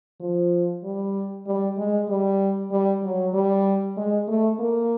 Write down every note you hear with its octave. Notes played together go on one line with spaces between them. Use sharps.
F3
G3
G3
G#3
G3
G3
F#3
G3
G#3
A3
A#3